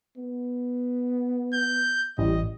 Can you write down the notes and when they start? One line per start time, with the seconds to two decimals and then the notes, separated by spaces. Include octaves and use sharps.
0.17 B3
1.54 G6
2.18 A1 G3 D#5